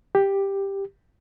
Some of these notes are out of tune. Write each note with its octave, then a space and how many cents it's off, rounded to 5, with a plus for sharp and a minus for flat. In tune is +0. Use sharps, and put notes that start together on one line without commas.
G4 +5